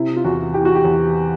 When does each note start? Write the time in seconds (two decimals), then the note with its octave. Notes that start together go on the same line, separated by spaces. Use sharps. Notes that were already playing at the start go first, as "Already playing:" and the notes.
Already playing: C3 E4
0.16 F4
0.25 E2 F#4
0.54 E3 G4
0.65 F#4
0.75 G4
0.84 E2